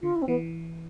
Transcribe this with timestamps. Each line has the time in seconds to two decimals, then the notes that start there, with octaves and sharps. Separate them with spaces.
0.02 D3 F4
0.15 E4
0.22 C4
0.27 E3 B3